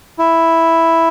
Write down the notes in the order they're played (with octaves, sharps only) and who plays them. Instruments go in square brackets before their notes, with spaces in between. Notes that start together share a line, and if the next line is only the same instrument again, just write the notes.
[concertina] E4